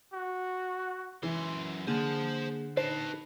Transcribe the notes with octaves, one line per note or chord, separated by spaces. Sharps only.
F#4
F#2 E3 C6
D3 A#3 G#4 C5 A5
D#4 B4 C5 A5 C7